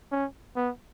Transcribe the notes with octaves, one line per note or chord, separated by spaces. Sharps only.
C#4
B3